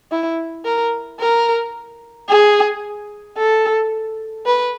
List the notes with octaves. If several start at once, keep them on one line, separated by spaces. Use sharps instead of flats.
E4
A#4
A#4
G#4
A4
B4